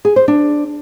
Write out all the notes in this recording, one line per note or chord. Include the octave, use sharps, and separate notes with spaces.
G#4
C5
D4